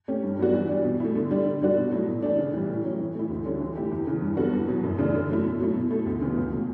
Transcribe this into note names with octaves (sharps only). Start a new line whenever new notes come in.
A3 C#4 G4
G2
F#3 B3 D4 F#4
E3
G3 D4
B2
A3 E4
D3
G3 D4
D3
G3 D4 F#4
B2
F#3 A3 E4
A2
E3 A3 D4
C#3
E3 G3
A2
F#3 C#4
E3
A3 E4
D2
D3 G3 C#4
E3
A3 E4 G4
E2
C#3 E3
G2
F#3 B3 F#4 A4
E2
B2 F#3
F#2
C#3 E3 A3 D4
D3
F#3 A3 E4
B2
F#3 A3 E4
B2
A3 E4 A4
D2
C#3 E3 B3
C#2
B2 A3